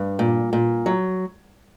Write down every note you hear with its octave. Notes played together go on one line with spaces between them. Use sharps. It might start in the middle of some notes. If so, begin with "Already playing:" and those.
Already playing: G2
A#2
A#2
F#3